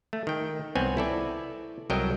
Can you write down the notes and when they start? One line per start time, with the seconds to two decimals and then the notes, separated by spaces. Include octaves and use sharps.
0.13 A3
0.27 D#3 G5
0.75 C2 B3 C4 C#5 G#5
0.97 E4 A4 D5
1.90 C2 F#3 A4 A#4 D#5 G5